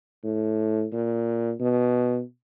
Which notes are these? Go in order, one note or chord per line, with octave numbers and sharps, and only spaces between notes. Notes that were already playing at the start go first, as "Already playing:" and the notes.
A2
A#2
B2